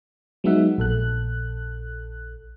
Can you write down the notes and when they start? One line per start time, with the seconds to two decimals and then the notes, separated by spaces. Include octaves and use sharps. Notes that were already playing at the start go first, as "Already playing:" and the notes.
0.44 F#3 G#3 B3 D#4 E5 F#5
0.78 A#1 A4 F#6